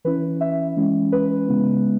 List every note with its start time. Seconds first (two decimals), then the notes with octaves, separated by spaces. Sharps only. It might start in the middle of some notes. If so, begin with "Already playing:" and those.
0.05 E3 C#4 E4 B4
0.41 E5
0.77 E3 G#3 C#4 E4
1.12 B4
1.48 C#3 G#3 B3 E4